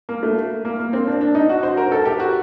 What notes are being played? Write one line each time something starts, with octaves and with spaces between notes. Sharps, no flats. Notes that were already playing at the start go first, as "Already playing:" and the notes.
A#3
A3
A#3
A#3
C4
D4
D4
D#4
F#4
C5
A#4
A4
G4
F#4